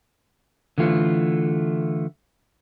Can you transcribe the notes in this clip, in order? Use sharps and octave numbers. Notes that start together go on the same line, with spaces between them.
D3 E3 A3 F4